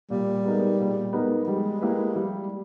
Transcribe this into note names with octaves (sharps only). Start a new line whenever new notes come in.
A#2 G3
G#3 B3 D#4 A#4
A#2
G#3 B3 D#4 A#4
G3 G#3
A#3 E4 G4 B4
G3